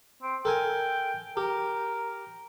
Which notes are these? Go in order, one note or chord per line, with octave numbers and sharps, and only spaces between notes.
C4
A4 A#4 G5 G#5
G4 A#4